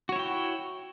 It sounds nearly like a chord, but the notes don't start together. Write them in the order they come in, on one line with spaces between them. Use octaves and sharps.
F#4 C#5 E4 G5